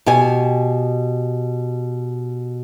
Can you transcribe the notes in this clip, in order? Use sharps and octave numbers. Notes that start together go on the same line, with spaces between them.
B2 G4 G#5